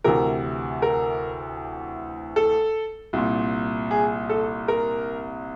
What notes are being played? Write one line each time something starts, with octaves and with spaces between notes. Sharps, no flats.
D2 C3 E3 A#4
A#4
A4
C2 A#2
G#4
A4
A#4